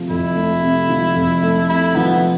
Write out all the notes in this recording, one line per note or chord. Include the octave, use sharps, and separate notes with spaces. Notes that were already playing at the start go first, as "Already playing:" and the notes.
Already playing: C3 F3 A3
F2 E4
A3
C3
F3
F2
A3
C3 E4
F3 B3